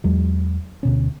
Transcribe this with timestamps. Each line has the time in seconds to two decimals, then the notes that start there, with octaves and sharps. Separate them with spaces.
0.04 E2 F#3 G#3
0.83 D2 B2 C#4